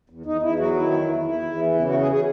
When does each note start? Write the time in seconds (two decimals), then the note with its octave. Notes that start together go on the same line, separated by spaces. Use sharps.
0.10 E2
0.25 E2 D#4
0.42 E2 E4
0.59 F#3 F#4
0.76 D#3 E4
0.92 E2
1.09 E2
1.25 E2 E4
1.42 E2
1.58 E3
1.74 C#3 E4
1.87 F#4
1.92 E2
2.00 G#4
2.12 G#4